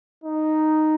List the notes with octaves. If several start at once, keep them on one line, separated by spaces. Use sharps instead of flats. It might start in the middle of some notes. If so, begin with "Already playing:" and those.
D#4